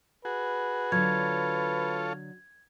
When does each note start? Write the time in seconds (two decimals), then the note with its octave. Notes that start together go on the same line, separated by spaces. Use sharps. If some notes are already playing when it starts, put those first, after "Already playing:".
0.25 F#4 G#4 B4
0.92 D3 F#3 F4 A4 C#5 G#6